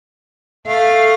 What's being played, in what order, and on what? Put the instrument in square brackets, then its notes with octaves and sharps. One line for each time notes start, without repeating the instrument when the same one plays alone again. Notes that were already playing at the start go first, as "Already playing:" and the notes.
[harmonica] A3 [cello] F5